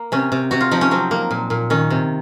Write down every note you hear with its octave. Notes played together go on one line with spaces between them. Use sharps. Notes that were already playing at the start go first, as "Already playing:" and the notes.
Already playing: A#3
C3 C#4
C3
C3 F#4
F4
F3 D#4
C#4
F#3 C4
A#3
A#2
A#2
D#3 C#4
C3